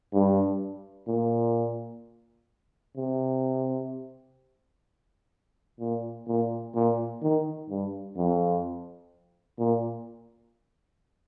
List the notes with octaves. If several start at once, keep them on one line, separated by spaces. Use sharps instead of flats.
G2
A#2
C3
A#2
A#2
A#2
D#3
G2
F2
A#2